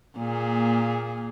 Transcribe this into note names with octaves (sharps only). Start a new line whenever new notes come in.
A#2 A#3 G#4